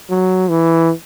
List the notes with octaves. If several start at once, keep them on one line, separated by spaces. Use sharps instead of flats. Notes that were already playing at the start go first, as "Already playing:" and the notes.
F#3
E3